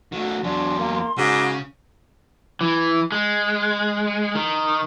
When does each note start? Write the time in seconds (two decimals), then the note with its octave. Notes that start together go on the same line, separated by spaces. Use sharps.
0.12 D#3 A3 F#4
0.44 E2 F#3 D4 C6
0.79 A#3
1.18 G#2 C#3 F#4 D6
2.61 E3
3.12 G#3
4.35 D#3